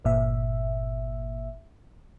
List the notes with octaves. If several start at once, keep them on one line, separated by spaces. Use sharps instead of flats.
G1 A#2 E5